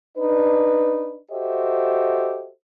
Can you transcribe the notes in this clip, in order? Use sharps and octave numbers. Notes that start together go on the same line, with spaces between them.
D4 D#4 B4
F#4 G4 A4 C5 D#5 E5